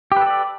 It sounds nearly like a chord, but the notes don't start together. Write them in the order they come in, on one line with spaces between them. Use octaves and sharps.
G4 B4 A4 D5